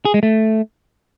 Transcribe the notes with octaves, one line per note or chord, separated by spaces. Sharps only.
G#4
G#3
A3